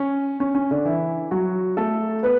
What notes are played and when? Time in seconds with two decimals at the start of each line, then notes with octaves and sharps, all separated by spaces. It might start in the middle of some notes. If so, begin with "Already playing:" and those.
Already playing: C#4
0.40 C#4
0.55 C#4
0.71 D3 D4
0.85 E3 E4
1.31 F#3 F#4
1.77 A3 A4
2.23 B3 B4